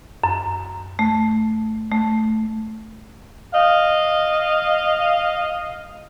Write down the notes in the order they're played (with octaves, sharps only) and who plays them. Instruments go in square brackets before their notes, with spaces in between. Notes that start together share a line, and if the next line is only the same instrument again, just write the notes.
[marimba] F#2
A3
A3
[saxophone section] D#5 F5